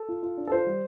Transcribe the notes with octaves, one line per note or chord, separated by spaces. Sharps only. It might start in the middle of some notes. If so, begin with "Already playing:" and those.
Already playing: A4
F4
F4
D4
A4
F4 C5
G3